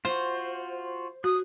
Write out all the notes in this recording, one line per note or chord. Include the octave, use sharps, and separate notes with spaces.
F4 F#4 C5
F#4 D#6 F#6